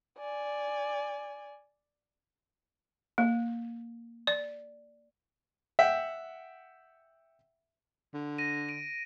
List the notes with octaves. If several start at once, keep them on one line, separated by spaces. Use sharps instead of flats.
D5 G#5
A#3
D5
E5 F#5 G5
D3
A#6 D#7
D7 D#7